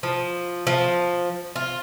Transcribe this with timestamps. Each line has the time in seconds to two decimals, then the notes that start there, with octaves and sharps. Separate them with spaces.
0.03 F3
0.67 F3
1.56 F4